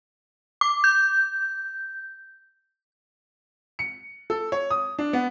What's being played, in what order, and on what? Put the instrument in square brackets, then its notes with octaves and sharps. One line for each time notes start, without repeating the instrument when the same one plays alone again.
[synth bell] D6
G6
[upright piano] C#7
A4
C#5
D#6
D4
B3